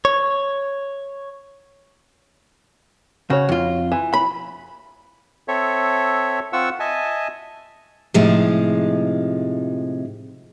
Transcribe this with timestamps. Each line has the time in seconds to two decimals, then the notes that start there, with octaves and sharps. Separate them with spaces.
0.05 C#5
3.30 C#3 F#4 C#5
3.49 F2 F4
3.92 E3
4.14 B5
5.48 C4 A4 C#5 E5
6.53 C4 F4 F#5 C#6 E6
6.80 D#5 E5 G#5 A5
8.14 A2 C3 F3 G#3 D#4 F4